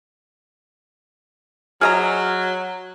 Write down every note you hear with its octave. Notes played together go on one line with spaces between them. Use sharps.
F#3 G#4 D#5 A#5 F6